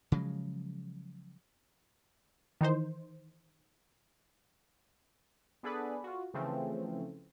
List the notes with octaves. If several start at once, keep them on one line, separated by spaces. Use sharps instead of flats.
C#3 F3 F#3 G#3
D#3 E3 D#4 C5
B3 D4 G#4 A4 B4 D5
F4 F#4
C#3 E3 F3 A3 C4 C#4